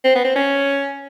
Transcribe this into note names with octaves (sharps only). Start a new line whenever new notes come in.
C4
B3
C4
C#4